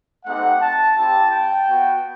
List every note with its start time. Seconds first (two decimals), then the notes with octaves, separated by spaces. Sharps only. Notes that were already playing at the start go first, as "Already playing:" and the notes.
0.24 A3 C4 D#4 G4 F#5
0.60 A5
0.95 C4 E4 G4 A5
1.30 G5
1.66 B3 F#4